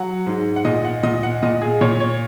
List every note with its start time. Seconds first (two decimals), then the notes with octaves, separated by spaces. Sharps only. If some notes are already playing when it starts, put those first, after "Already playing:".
Already playing: F#3 F#5
0.27 G#2
0.56 F#5
0.65 A#2 D#5
0.85 F#5
1.03 A#2 D#5
1.23 F#5
1.43 A#2 D#5
1.62 G#4
1.81 A#2 C#5
2.00 C#5